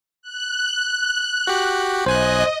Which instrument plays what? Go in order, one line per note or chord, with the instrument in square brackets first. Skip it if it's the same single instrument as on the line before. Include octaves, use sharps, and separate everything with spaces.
[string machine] F#6
[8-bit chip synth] F#4 G4
[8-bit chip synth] B1 G#5 F#6 [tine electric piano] C5 [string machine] D#5